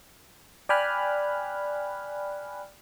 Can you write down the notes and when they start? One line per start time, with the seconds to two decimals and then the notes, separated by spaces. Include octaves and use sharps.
0.69 D5 G5 G#5 B5 F6 F#6